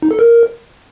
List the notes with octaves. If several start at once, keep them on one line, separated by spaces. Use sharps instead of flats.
D#4
A4
A#4